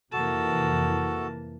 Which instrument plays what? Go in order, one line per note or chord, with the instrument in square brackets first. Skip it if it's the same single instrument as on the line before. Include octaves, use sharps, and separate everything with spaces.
[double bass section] F2 C3 E3 [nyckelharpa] A#3 A5 [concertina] F#4 A4